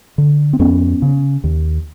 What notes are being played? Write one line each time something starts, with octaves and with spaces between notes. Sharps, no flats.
D3
C4
F2 B3 C#4
C#3
D#2